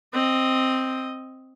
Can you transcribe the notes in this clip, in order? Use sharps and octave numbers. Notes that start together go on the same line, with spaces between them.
C4 D#5